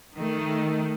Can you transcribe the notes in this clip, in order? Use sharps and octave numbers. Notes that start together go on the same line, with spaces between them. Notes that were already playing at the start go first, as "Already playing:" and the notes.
D#3 A3